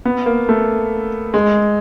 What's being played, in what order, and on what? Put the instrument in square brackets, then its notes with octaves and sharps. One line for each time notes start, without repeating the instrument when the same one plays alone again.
[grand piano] B3
A#3
A3
G#3